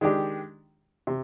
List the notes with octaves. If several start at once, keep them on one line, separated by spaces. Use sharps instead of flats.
D#3 G#3 D4 G4
C3